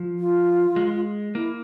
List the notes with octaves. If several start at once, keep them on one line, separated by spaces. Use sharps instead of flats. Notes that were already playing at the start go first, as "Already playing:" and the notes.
Already playing: F3
F4
G#3
A#3 E4